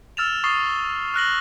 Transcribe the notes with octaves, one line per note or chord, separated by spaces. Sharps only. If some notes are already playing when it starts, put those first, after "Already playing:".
E6 F6 A6 E7 F7
C#6 D#6 A6 C7 G7
F6 F#6 A#6 F#7